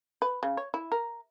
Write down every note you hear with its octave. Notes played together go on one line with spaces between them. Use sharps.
B4
C#3
C#5
E4
A#4